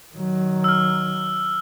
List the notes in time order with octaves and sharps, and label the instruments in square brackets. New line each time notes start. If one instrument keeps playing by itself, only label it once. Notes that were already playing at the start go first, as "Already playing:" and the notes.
[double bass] D#3 F#3
[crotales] E6 F6